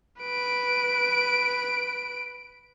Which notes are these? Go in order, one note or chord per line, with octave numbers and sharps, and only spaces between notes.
B4 D7